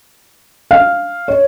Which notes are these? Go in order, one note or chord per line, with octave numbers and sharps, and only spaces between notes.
F5
C#5